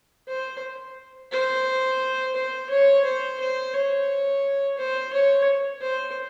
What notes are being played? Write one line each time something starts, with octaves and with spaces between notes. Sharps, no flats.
C5
C5
C5
C#5
C5
C5
C#5
C5
C#5
C5